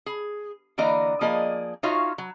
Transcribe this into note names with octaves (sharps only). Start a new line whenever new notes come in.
G#4
D3 E3 A#3 D5 D#5 A#5
F3 A#3 G#4 D5 D#5
D#4 F4 F#4 C#5 E5 F5
F#3